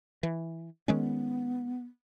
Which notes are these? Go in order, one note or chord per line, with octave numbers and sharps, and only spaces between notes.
E3
D#3 G#3 B3 C#4